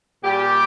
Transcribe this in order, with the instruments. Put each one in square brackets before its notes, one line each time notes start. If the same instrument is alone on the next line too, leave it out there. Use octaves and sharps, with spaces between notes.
[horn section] A#2 G3 G4